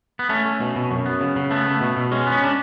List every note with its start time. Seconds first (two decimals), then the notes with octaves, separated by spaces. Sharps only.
0.19 B3
0.29 A3 C#4
0.46 A3
0.61 B2
0.76 B2
0.91 F#2
1.06 B3
1.21 C#3
1.36 C#3
1.51 A3 B3
1.66 A3
1.81 B2
1.97 B2
2.12 G#3 C#4
2.27 B3
2.32 C#4
2.44 D4